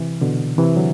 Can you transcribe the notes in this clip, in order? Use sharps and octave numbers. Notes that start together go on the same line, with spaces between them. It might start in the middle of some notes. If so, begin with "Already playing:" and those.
Already playing: C3 E3
B2 D3
C3 E3
D3 F#3